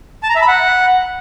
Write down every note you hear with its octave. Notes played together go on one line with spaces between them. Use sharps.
A5
A#5
E5
B5
F#5